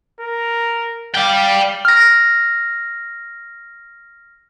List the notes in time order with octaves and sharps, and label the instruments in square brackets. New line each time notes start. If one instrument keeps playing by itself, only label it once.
[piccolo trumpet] A#4
[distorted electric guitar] D5 G5 [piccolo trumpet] F5
[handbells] F6 A#6